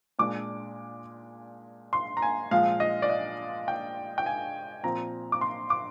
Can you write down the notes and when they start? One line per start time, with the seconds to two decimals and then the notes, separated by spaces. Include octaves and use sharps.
0.19 A#2 G#3 D4 D6
1.93 C6
2.17 A#5
2.22 G#5
2.51 A#2 F3 G#3 F5
2.80 D#5
3.02 D5
3.10 D#5
3.68 G5
4.18 G5
4.26 G#5
4.83 A#2 F3 C4 A#5
5.32 D6
5.41 C6
5.70 D6